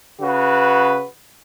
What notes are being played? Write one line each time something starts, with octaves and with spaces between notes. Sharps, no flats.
C#3 F#4 B4